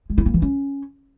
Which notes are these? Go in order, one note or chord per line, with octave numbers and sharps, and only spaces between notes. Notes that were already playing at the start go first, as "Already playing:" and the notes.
G#3
E4
A#3
E3
C#4